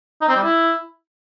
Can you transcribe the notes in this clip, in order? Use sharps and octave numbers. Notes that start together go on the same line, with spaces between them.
D#4
C4
G3
E4